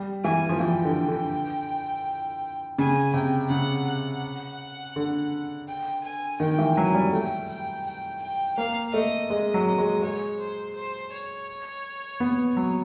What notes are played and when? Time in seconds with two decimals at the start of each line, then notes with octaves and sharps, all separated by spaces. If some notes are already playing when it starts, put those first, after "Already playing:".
Already playing: G3
0.23 E3 G#5
0.49 F3
0.60 E3 G5
0.85 D3
1.08 D3
2.78 C#3 G#5
3.13 C3 G5
3.50 C#3 F#5
3.87 F#5
4.96 D3
5.67 G5
6.04 G#5
6.40 D#3 G5
6.59 E3
6.77 F#3 G#5
6.94 G3
7.13 A3 G5
7.49 G5
7.86 G5
8.22 G5
8.58 A#3 F5
8.94 A3 D#5
9.30 G#3 D#5
9.54 F#3
9.78 G#3
10.02 G#3 C#5
10.39 C5
10.75 C5
11.12 C#5
12.20 B3
12.57 F#3